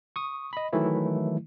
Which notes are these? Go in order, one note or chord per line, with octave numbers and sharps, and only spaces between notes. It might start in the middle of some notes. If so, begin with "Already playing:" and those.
C#6 D#6
D#5 B5
D#3 E3 F#3 A3 E4